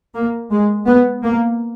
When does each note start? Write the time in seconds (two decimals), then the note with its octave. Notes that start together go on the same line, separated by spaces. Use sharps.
0.15 A#3
0.51 G#3
0.87 B3
1.23 A#3